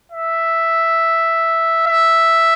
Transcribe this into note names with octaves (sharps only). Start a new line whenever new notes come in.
E5
E5